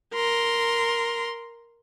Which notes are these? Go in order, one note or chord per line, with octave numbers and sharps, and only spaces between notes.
A#4 C6